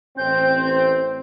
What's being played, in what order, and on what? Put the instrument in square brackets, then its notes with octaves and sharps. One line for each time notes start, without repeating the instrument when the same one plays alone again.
[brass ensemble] A1 C4 [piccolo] G6